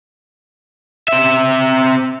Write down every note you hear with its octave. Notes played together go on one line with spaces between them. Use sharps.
C4 E5